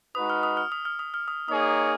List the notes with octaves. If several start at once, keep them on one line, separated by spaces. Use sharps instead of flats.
G#3 D#4 F#4 B4 D#6
F6
D#6
F6
D#6
F6
D#6
F6
D#6
A#3 D#4 G#4 C#5 D#6